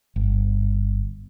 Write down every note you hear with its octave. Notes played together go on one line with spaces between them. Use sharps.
G1